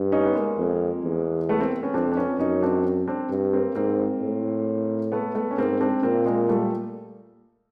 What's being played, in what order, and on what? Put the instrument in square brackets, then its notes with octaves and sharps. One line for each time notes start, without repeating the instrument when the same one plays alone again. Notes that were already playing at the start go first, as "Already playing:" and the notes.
Already playing: [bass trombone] G2
[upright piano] C#4 D#4
B3
G#3 A#3
[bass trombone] F2
E2
[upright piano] A3 B3
A#3 C4
B3 C#4
[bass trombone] F2 [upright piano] C4 D4
[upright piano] D4
B3 C#4
[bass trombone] F#2 [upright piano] C#4 D#4
[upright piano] C4 D4
C4 D4
[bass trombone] G2
[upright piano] A#3 C4
[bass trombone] G#2 [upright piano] A#3 C4
[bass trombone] A2
[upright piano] A3 B3
A3 B3
C#4
[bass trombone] G#2 [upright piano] A#3 C4
[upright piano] C4 D4
[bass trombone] A#2 [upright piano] A#3 C4
[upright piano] G#3 A#3
G3 A3